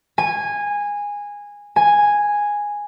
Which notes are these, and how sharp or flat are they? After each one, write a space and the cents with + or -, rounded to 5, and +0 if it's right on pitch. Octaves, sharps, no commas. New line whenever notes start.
G#5 -15
G#5 -5